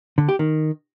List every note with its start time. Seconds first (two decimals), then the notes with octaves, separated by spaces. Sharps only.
0.18 D3
0.29 G4
0.39 D#3